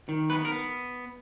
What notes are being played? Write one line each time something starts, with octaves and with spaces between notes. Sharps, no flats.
D#3
B3 B4
A#4
B3